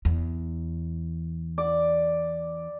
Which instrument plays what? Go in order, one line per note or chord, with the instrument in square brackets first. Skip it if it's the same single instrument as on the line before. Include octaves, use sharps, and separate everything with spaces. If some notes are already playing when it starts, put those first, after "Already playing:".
[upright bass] E2
[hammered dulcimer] D5